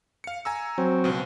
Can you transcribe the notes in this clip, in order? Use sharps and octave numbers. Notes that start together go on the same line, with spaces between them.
F5 C#7
G#5 A#5 E6
F#3 C4
C#2 B2